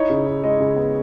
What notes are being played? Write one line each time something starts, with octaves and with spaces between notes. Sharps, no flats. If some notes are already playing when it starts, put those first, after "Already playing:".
Already playing: D#4 E4 C#5
C#3
D#4
G#3 D#5
C#3
B3